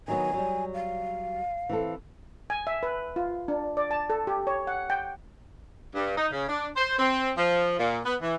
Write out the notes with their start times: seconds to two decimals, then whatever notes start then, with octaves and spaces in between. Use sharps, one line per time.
0.08 D#3 F#3 B3 G#5
0.34 F#3 G3
0.74 F5
1.69 E3 C4 A4
2.50 G#5
2.67 E5
2.83 B4
3.16 F4
3.48 D4
3.77 D5
3.91 A5
4.10 A4
4.27 G4
4.47 C#5
4.67 F#5
4.90 G5
5.94 G2
6.17 D#4
6.31 C#3
6.48 D4
6.76 C5
6.99 C4
7.37 F3
7.79 A#2
8.05 B3
8.22 E3